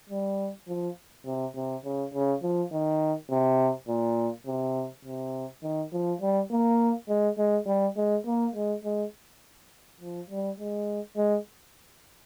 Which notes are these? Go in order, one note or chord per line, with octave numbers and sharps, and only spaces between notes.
G3
F3
C3
C3
C#3
C#3
F3
D#3
C3
A#2
C3
C3
D#3
F3
G3
A#3
G#3
G#3
G3
G#3
A#3
G#3
G#3
F3
G3
G#3
G#3